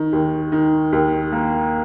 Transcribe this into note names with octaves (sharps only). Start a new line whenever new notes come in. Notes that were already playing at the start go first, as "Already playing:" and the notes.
Already playing: D#3
D#2
D#3
D#2
A#3